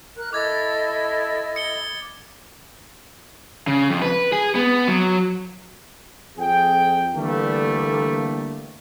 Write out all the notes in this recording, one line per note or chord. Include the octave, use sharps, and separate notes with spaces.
A#4 F#6
E4 A4 D#5 D6 G#6 A6
D#6 C#7 G7
C#3
F2
B4
G#4
B3
F#3
F2 G#4 G5
D3 E3 G3 A3 A#3